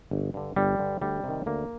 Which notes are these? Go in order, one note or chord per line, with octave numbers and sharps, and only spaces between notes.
G1
G2 D3
G1 G3
G2 D3
D2 G3
C3 D#3
D2 A#3